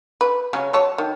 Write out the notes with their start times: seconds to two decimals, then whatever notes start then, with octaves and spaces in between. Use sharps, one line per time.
0.21 B4
0.53 C#3 F#3 C#4
0.73 F#3 C#5 A5
0.98 D#3